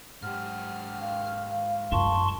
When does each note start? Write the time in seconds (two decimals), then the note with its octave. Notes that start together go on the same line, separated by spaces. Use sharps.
0.22 G#2 G4 F#5 F6
1.00 F5
1.92 F#2 F4 A5 C6 C#6